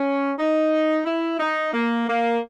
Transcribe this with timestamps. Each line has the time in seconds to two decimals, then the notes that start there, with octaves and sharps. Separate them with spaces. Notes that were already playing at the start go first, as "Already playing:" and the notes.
Already playing: C#4
0.38 D#4
1.05 E4
1.40 D#4
1.73 A#3
2.07 A#3